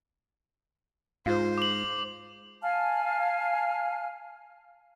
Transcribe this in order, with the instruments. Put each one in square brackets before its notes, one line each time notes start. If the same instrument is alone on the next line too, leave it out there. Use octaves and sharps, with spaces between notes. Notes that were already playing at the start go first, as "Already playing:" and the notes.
[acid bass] G#2 [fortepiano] F4 [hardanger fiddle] C5
[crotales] D6 F#7
[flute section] F5 G#5 A5 F6